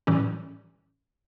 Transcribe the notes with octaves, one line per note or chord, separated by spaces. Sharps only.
A2 E3 G3 C#4